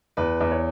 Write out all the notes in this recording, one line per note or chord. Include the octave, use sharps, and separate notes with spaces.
E2 B4
E2
C#5